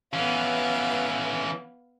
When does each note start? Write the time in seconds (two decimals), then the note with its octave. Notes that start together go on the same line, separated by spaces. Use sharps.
0.13 E3 B3 C#4 F5